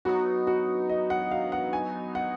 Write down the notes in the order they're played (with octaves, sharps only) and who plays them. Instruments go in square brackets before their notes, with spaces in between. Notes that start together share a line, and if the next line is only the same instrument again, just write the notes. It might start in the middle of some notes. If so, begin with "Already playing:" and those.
[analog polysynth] F#3 B3 D#4 [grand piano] F#4
[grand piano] F#4
D#5
F#5
F5
F#5
G#5
F#5